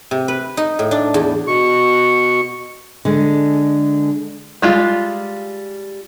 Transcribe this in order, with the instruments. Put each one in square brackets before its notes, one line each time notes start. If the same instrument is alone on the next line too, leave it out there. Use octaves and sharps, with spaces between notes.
[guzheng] C3
B4
D#4
A2
D4
E2
[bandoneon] B2 C#6
[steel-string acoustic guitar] D3 G#3
[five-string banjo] G3 G#3 F4